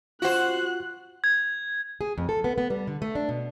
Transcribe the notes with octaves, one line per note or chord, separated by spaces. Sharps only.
F4 F#4 C5 F#5 F#6
G#6
G#4
F2
A4
B3
B3
G3
D3
A3
D4
B2